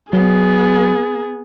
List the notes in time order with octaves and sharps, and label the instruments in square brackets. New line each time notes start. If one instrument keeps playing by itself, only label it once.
[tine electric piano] F#3 [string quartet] B3 [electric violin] G#4